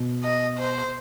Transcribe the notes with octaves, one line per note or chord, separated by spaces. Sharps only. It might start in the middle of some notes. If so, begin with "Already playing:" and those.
Already playing: B2
D#5
C5